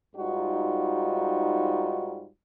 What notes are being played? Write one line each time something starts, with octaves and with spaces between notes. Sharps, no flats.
G#2 G3 D#4 F4 F#4